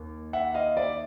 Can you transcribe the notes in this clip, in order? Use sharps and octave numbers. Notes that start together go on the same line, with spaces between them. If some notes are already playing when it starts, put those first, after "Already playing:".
Already playing: D#2
E5 F#5
D#5 F5
D5 E5